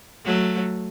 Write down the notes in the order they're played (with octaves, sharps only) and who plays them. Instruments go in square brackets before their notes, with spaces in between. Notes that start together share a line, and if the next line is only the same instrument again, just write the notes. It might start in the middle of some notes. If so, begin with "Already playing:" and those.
[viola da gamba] F#3 A3